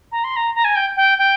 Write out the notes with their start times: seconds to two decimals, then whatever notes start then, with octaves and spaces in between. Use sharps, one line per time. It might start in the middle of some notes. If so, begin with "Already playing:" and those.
0.12 A#5
0.24 C6
0.36 A#5
0.55 A#5
0.64 G#5
0.76 G5
0.96 G5
1.18 G5